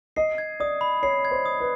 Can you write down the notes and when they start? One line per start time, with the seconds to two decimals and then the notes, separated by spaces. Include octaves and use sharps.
0.16 D#5 C7
0.38 G#6
0.60 D5 D#6
0.81 B5
1.03 C#5 C7
1.25 G#6
1.31 C5
1.46 D#6
1.60 B4